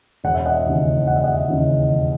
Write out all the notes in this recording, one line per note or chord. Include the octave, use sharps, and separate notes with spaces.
E1 F#5
E5
D#5 F#5
D#2 C#3 E3
E1 F#5
E5
D#5 F#5
D#2 C#3 E3
E1